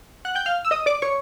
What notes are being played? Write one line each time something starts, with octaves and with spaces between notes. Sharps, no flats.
F#5 F#6
G5 G6
F5 F6
E6
D#5 D#6
D5 D6
C#5 C#6